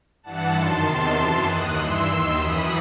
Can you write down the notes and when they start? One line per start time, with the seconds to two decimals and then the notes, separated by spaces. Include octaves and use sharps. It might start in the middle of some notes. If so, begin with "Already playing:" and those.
0.23 G2 E3 F#5 A5
0.53 F#2 D#3 A5 C6
0.84 E2 C3 D#3 A5 C6
1.14 F#2 E3
1.45 D#2 D#3 D#6 F#6
1.75 G2 E3 C6 E6
2.06 D#2 D#3 C6 E6
2.36 F#2 E3 B5 D#6